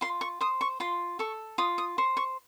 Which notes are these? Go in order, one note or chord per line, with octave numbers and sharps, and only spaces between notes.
F4 C6
C#6
C5 D#6
C#6
F4 C6
A4 C#6
F4 D#6
D#6
C5 C#6
C#6